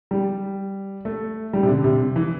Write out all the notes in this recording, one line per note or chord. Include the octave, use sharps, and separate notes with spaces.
G3
A3
G3
C3
D3
C3
E3